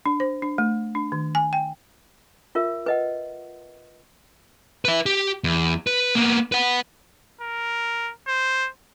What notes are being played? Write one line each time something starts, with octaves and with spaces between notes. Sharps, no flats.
D4
C5
D4
A3
D4
D#3
G#5
G5
F4 A#4 E5
B4 D#5 F#5
B4 E5
G4
E2
B4
A#3 B3
B4 F#5
A#4
C5